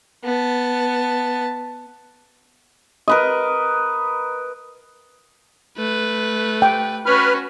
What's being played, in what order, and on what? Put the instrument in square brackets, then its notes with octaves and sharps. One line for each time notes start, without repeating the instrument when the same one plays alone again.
[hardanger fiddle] B3 A5
[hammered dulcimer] A#4 B4 D#5
[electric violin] A3 B4
[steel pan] G5
[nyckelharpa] C#4 F#4 [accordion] B4 B5 F6